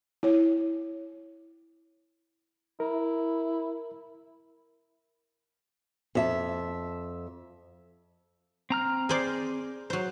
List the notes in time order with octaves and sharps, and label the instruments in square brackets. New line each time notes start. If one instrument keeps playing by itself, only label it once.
[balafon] E4 C#5
[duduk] E4 [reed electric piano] A#4
[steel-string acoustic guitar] F2 E5 A5
[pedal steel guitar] C4 A#5 F6
[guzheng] G#4 C5 D5
F#3 C5